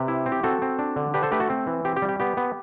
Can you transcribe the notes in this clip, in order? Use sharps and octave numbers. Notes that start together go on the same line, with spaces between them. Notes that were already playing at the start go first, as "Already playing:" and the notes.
Already playing: C3 G4 B4
E4
C4
G4
C4 F#4 A4
C4
D4
D3
D4 G4 B4
A4 C5
A3 G4 B4
F#4 A4
C4
E3
C4 G4
G4
G3
G4
B3 G4
B3